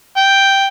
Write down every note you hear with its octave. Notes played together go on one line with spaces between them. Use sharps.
G5